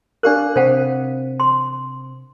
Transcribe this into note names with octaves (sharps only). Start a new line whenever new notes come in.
D4 G4 A#4 D5 F5 F#6
C3 C4 C5 F5 F#5
C6